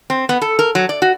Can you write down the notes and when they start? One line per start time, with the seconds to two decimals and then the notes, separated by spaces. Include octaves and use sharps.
0.10 C4
0.29 B3
0.42 A4
0.59 A#4
0.75 F#3
0.89 D5
1.02 F#4